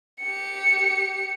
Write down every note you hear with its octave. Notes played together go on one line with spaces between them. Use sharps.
G4 C#7